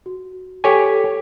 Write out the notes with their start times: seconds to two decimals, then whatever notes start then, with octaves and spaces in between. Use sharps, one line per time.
0.06 F#4
0.64 G4 A4 C#5 G#5 B6